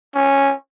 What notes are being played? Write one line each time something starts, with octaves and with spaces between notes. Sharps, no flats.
C#4